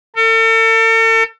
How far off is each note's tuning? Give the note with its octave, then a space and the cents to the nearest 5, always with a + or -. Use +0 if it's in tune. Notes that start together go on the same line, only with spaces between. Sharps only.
A4 +40